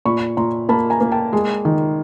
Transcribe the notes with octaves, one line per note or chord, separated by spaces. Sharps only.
A#2 B5 C#6
A#2 A#5 C6
A#3 A5 B5
G#5 A#5
A#3
G5 A5
G#3
D#3